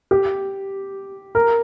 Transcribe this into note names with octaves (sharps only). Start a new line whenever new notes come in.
G4
A#4